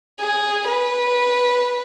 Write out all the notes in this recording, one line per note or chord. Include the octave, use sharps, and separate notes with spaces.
G#4
B4